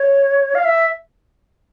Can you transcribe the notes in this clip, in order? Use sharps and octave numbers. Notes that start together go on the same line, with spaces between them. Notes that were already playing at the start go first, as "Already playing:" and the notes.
Already playing: C#5
F5
E5